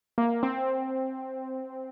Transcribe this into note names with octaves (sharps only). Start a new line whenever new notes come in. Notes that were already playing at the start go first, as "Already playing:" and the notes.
A#3
C4